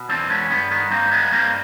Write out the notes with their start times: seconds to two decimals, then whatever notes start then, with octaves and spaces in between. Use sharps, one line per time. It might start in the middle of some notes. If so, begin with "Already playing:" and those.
Already playing: B2
0.09 E2 C4 D4
0.29 G#3 B3 C#4
0.50 G2 B3
0.71 D#3 B3
0.91 G2 A#3 C4
1.12 G#3 B3
1.32 G2 A#3 C4